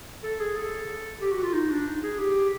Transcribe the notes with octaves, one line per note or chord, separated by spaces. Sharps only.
A4
G#4
A4
G4
F#4
F4
D#4
D4
D#4
G#4
G4